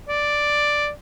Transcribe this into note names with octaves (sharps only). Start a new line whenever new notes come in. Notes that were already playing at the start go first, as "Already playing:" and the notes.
D5